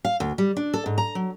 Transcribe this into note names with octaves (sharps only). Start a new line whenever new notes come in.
F5
D2
G3
D4
A4
G#2
A#5
F#3